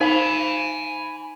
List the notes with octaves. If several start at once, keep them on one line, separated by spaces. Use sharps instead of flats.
D#4 C5 F5 G#5 B5